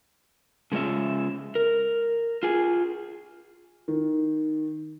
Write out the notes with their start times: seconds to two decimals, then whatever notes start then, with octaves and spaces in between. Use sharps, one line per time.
0.72 C#3 G#3 F4 C#5 E5
1.55 A#4
2.43 F4 G#4
3.88 D#3